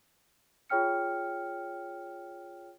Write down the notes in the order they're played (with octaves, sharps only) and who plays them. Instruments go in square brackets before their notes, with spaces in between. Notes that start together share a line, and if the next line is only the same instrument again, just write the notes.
[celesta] F4 G#4 C#5 G5 F6 C#7